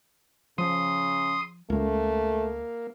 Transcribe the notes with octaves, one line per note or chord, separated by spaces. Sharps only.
C#3 F3 C6 D#6
C#2 A3 A#3